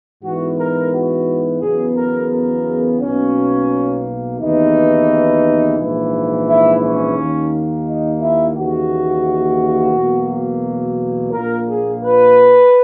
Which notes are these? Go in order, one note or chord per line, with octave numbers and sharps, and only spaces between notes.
G#2 E3 B3 F#4
A#4
F#4
E2 C#3 F#3 B3 G#4
A#4
A#4
B1 B2 A#3 C#4
D#2 C#3 E3 B3 D#4
A#1 G#2 E3 A#3
E4
C#4
D#2 D#3 A#3
D#4
E4
D#2 C#3 E3 A#3 F#4
E2 B2 F#3 A#3
A#1 A#2 A#3 A#4
G#4
B4